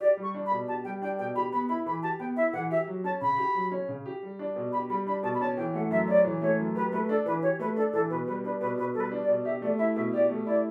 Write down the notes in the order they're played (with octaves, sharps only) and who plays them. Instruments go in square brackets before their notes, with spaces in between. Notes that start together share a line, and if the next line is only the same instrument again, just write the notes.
[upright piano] G4 [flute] D5
[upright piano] G3
[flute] C#6
[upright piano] D4
[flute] B5
[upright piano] B2
[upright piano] G4 [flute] A5
[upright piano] G3 [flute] G5
[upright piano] D4 [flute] G5
[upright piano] B2 [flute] G5
[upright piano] G4 [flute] B5
[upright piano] B3 [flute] B5
[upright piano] E4 [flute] B5
[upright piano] E3 [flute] B5
[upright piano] G4 [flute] A5
[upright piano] B3 [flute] G5
[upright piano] E4 [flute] E5
[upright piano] E3 [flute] F#5
[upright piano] G4 [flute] E5
[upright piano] F#3
[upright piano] C#4 [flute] A5
[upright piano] C#3 [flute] B5
[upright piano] G4
F#3
C#4
C#3
G4
G3
D4
B2
[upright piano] G4 [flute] B5
[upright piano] G3 [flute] B5
[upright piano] D4 [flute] B5
[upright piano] B2 [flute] A5
[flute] B5
[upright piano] C#4 [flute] A5
[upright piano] E3 [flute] G5
[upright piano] A3 [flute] F#5
[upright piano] F#2 [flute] E5
[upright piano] C#4 [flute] D5
[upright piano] E3
[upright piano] A3 [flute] C#5
[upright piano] F#2
[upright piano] G4 [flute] B4
[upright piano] A3 [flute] B4
[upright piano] D4 [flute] A4
[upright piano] E3 [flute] B4
[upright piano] G4 [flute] C#5
[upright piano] A3 [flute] B4
[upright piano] D4 [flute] A4
[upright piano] E3 [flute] A4
[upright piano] B2 [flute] B4
[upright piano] G3 [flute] B4
[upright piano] D4 [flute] B4
[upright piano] B2 [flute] B4
[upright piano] B2 [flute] B4
[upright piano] G3 [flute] A4
[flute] B4
[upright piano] D4
[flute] D5
[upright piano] B2
[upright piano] G4 [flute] E5
[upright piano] A3 [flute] D5
[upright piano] E4 [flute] E5
[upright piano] B2 [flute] E5
[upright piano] G4 [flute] D5
[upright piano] A3
[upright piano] E4 [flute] D5